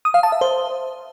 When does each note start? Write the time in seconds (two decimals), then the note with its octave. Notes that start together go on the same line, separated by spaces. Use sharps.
0.05 D#6
0.14 F5
0.23 A5
0.32 E5
0.41 C5